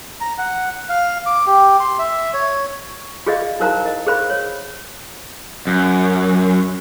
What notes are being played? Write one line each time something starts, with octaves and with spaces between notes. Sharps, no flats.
A#5
F#5
F5
D6
G4
C6
E5
C#5
F4 G#4 D5 D#5 F5
D#4 E4 A#4 C5 F5 A#5
A#4 D#5
G#4 A#4 C5 F5 B5
C#5
F#2